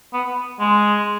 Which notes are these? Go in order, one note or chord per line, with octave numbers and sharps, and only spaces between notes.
B3
G#3